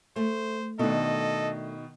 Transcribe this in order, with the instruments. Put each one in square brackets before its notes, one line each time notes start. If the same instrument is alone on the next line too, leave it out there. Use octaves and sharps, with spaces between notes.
[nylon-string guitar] A3 [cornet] C5
[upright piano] B2 D#3 [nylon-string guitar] A3 D4 [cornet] A4 [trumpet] D#5